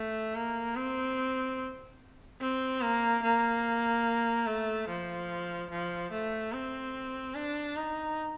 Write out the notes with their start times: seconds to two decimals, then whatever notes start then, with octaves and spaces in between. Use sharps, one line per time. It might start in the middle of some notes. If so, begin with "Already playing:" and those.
Already playing: A3
0.35 A#3
0.76 C4
2.41 C4
2.81 A#3
3.23 A#3
4.47 A3
4.88 F3
5.71 F3
6.12 A3
6.53 C4
7.35 D4
7.77 D#4